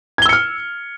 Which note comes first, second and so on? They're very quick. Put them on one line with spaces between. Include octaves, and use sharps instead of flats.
G#6 G7 E6 C#7 F6